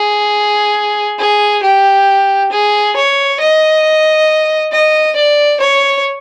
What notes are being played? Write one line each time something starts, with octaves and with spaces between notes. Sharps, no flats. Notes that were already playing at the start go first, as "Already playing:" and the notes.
Already playing: G#4
G#4
G4
G#4
C#5
D#5
D#5
D5
C#5